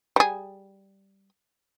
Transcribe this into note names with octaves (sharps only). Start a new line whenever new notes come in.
G3 G#4